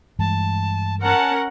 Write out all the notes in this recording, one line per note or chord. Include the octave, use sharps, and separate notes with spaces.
G2 E3 G#3 A5
C#4 A#4 F#5 A5